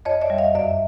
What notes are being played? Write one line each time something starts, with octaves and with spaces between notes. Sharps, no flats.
F2 C#5 D#5
D5 E5
G3
D#5 F5
F#2 D5 E5